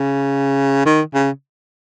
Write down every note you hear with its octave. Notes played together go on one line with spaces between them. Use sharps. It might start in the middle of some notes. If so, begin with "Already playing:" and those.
Already playing: C#3
D#3
C#3